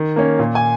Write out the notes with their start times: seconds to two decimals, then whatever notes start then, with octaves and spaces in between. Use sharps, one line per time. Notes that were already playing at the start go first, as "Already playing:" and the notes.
Already playing: D#3
0.16 A#3 C#4
0.39 A#2
0.55 G#5